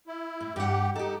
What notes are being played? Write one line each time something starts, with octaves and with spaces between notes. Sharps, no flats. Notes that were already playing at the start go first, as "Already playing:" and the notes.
E4
A2
G2 G4 F#5
D#4 G4 A4